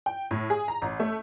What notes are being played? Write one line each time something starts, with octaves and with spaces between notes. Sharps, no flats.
G5
A2
G#4
A#5
A1
A3